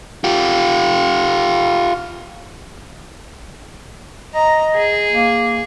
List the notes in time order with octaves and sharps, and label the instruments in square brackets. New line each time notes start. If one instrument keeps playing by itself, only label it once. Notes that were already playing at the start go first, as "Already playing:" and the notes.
[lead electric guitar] F4 G4
[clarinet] D#5 [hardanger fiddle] A#5
[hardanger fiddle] G#4
[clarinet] A#3